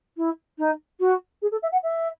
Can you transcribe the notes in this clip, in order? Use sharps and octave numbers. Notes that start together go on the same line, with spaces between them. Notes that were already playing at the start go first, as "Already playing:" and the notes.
E4
D#4
F#4
G#4
A4
E5
F#5
E5